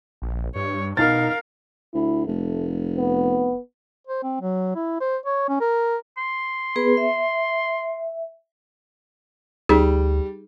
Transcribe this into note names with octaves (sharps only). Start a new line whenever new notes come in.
A#1
G2 C#5
B2 D#4 A#4 F5 A6
D2 E4
F1 A3
B3
C5
C4
F#3
E4
C5
C#5
C#4
A#4
C6
B3 G#4 B4
E5
D2 G3 D#4 G#4